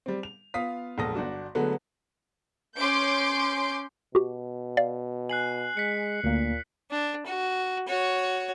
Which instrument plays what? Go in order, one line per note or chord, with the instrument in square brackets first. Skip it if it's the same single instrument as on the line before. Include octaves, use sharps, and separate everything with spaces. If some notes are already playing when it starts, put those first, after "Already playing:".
[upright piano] G3 C4
F7
B3 F4 F5 D#6 B6
E1 A#1 A4 D#6 A#6
G1 D4 F#4
D3 F#3 G#3 A3 B3
[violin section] C#4 C6 D6 G6 D7
[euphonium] B2 [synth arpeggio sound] F#4 G4
[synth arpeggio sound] D5 F5
[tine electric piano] G#5 [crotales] F#6 C7 F#7
[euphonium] G#3 [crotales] B6 C#7
[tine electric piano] D2 A#3 [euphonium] A#2
[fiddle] D4
F#4
F#4 C#5